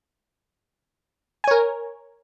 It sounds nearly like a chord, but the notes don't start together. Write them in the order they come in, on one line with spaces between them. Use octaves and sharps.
G#5 C#5 A#4